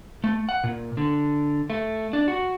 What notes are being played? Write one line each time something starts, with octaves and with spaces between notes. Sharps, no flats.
A3
F#5
A#2
D3
A3
D4
F#4